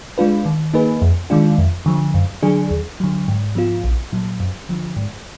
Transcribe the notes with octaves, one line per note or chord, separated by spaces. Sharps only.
G#3 D4 F4 B4
D#3
A#3 D#4 G#4 B4
F2
D#3 G#3 D4 F4
F2
D3 F3
F#2
D3 F#3 D4 G#4
D#2
D3 F#3
G#2
F3 B3 F4
A#1
A#2 F#3
F#2
D3 F3
G#2